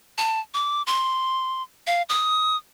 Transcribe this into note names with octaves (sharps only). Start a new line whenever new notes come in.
A5
D6
C6
F5
D#6